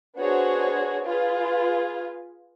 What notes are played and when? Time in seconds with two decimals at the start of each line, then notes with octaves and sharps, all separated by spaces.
0.19 B3 D4 F#4 G#4 C5 C#5
1.06 F4 G#4 B4